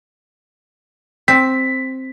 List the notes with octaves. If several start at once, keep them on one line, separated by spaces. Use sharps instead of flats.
C4 B6